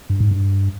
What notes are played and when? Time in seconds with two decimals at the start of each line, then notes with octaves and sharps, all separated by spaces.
0.10 G2
0.20 G#2
0.31 G2